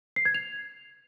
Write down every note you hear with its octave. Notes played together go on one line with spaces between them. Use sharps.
C7
G#6
F7